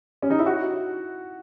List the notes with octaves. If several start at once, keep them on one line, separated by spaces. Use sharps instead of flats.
C#4
D#4
E4
F#4